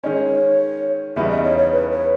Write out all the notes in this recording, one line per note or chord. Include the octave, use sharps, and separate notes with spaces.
D#3 G#3 C#4 C#5 D#5
E2 C#3 G3 B3 D#4 E5
D#5
C#5
C#5
B4
C#5